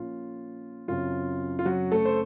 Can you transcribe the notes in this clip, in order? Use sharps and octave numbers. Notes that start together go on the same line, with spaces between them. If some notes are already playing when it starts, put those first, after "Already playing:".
Already playing: A#2 F3 A#3 C#4 F4
F#2 C#3 F#3 C4 F4
F4
F#3 F#4
A3 A4
C5